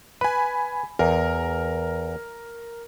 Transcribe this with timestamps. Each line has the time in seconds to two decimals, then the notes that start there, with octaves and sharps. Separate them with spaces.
0.21 B4 G#5 B5
0.99 E2 A#4